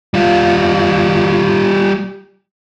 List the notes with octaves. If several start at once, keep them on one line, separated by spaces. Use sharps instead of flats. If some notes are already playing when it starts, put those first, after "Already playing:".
G3 F4